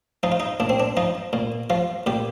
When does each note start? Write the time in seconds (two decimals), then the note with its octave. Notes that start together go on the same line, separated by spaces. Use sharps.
0.23 F3 D#4
0.32 F4
0.40 D#4
0.60 A#2 D4
0.69 C4
0.80 D4
0.97 F3 D#4
1.33 A#2
1.70 F3 F4
2.06 A#2 G4